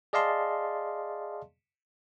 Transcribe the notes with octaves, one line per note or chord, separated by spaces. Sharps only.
G#4 D5 D#5 F5 A5 C6